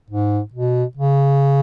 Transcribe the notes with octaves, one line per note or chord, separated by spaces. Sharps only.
G#2
B2
C#3